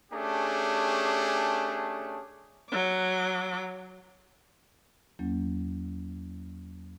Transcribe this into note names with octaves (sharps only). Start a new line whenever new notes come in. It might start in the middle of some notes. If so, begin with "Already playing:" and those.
A3 C#4 D4 G4 G#4
F#3 D6
E2 F#3 A#3 C#4